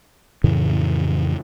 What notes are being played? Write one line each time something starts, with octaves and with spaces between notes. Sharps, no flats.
F2 A2 C#3 E3